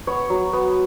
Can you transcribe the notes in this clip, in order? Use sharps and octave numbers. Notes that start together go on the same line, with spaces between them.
B3 C#5
F#3
B3